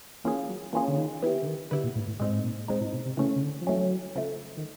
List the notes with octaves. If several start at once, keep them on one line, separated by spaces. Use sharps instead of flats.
E3 A#3 C#4 F4 G#4
F#3
E3 A#3 C#4 F4 G#4
D3
D#3
E3 B3 E4 G4
D3
D#3
D3 B3 E4 G4
A#2
A2
A2
A2 G#3 C4 D#4
G#2
A2
A#2
G#3 C4 D#4
A2
B2
C3
C#3 E3 A3 C#4
C#3
D3
F3
E3 F#3 A3 C#4
C#3 F3 A3
D#3